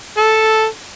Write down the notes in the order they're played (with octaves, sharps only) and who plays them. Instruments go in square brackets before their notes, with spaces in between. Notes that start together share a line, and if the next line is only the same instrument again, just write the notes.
[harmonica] A4